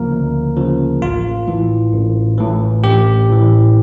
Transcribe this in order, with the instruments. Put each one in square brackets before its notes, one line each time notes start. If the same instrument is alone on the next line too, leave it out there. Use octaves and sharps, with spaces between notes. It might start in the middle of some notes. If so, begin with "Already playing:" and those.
Already playing: [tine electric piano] D2 C#3 F3 A#3 A#4
D2
C#3 F3
A1 F4
A2 E3
A1
A2 E3
A1 G4
A2 E3